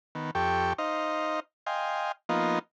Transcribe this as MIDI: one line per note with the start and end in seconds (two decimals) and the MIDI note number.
0.15 0.31 51
0.15 0.31 59
0.35 0.73 41
0.35 0.73 67
0.35 0.73 69
0.35 0.73 79
0.35 0.73 85
0.78 1.40 63
0.78 1.40 72
0.78 1.40 75
0.78 1.40 77
1.66 2.12 75
1.66 2.12 77
1.66 2.12 79
1.66 2.12 80
1.66 2.12 84
2.29 2.59 53
2.29 2.59 58
2.29 2.59 59
2.29 2.59 63
2.29 2.59 65
2.29 2.59 75